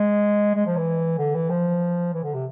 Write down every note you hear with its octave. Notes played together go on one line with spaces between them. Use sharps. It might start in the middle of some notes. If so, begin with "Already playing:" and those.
Already playing: G#3
G#3
F3
E3
D3
E3
F3
E3
D3
C3